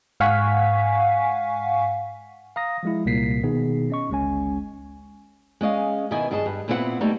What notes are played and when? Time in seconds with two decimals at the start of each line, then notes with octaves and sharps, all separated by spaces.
0.20 G#2 F5 F#5 G#5 C#6 B6
2.56 F5 A#5 D#6 A#6
2.83 F3 G#3 E4
3.05 C2 A#2 A#3 B6 C7
3.43 B2 D#3 B3 D#4 G#4
3.90 C#4 D#5 C#6
4.09 G1 C#2 G#3 C#4 G#5
5.61 G#3 C#4 D#5 F5
6.11 B2 D#3 B3 E4 D#5 G#5
6.31 G2 F#4 G#4 D#5 A5
6.46 G2
6.68 A#2 B3 C4 E4 A#4 F#5
7.01 G3 A3 A#3 D#4